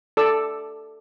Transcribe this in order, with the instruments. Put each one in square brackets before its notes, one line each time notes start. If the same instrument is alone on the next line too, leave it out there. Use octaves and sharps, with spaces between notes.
[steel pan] A4 D5 E6